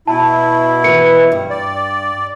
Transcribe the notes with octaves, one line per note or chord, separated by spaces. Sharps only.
B2 E4 A5
E3 B4 C#7
G2
D5